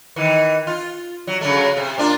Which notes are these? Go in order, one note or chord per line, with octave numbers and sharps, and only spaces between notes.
D#3 E3
F4
F#3
C#3 F#3 A3
C3
A#3 D4 F4